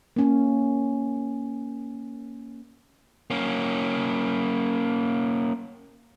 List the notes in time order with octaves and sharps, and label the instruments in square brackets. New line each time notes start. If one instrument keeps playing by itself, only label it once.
[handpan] A#3 C#4
[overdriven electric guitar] A#3 C#4